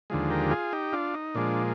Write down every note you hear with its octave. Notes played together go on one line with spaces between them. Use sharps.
D#2 D3 F3 G#3
G4 A#4
F4 G#4
D#4 G4
D4 F4
D#4
A#2 F3 G#3 D4